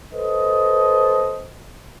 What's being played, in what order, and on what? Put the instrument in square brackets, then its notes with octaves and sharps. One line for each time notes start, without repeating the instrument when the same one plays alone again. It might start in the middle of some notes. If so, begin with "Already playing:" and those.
[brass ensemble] A4 B4 C5 D#5